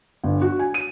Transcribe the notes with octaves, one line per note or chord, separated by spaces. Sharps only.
G1
F#4
G#5
D#7